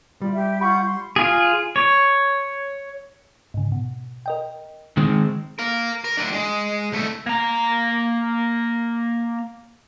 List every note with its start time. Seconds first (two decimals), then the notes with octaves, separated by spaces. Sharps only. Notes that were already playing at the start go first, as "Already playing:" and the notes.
0.22 G3 F4
0.33 G4 E5
0.61 F4 F#5 B5 C#6 G6
0.84 C6
1.16 F4 G#4
1.76 C#5
3.54 G#2 C#3
3.72 B2
4.26 A#4 D#5 G5
4.97 D#3 G#3 C4
5.59 A#4 F5
6.04 A#4
6.17 A2 D4
6.33 G#3
6.92 C2 A3
7.26 A#3 A#5